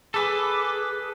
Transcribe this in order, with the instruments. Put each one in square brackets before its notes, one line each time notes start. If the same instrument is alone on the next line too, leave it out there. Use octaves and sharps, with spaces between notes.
[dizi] G#4 [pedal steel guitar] A4 B4 [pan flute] D6